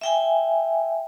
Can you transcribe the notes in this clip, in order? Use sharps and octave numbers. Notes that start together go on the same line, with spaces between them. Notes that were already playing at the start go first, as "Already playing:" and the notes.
E5 G5 G#5